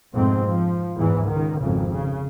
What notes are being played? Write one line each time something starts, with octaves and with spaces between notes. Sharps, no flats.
F2 G#2 B2 A3 C4
F3
E2 G#2 E3
C#2 D#3
G#1 F2 G#2 C#3
C#3